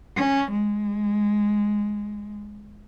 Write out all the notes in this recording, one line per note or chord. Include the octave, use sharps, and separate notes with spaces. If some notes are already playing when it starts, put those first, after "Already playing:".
C#4
G#3